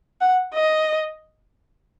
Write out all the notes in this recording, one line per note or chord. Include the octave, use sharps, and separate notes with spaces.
F#5
D#5